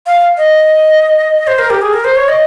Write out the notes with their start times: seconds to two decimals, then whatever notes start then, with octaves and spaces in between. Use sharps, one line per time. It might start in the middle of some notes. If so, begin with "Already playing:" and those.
0.06 F5
0.37 D#5
1.47 C5
1.58 A#4
1.70 G4
1.82 G#4
1.93 A#4
2.04 C5
2.16 C#5
2.28 D#5